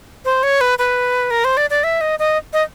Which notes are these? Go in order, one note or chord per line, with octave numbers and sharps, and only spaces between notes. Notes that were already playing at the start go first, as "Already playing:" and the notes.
C5
C#5
B4
B4
A#4
C5
D5
D5
E5
D#5
D#5
D#5